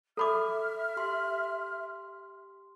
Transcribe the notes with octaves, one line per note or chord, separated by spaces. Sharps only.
A4 E5 B5 D6 F6
G4 C6